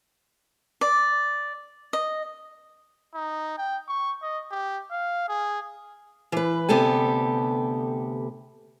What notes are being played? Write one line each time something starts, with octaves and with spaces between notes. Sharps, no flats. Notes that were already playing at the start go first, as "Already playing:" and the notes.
D5
D#5
D#4
G5
C#6
D#5
G4
F5
G#4
E3 B4
D2 C3 B3 G4 A4 G#5